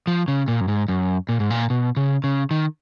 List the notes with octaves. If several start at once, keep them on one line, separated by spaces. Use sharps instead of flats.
F3
C#3
A#2
F#2
G#2
F#2
A#2
G#2
A#2
B2
C#3
C#3
D#3